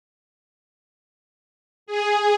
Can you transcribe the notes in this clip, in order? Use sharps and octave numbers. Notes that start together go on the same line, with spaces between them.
G#4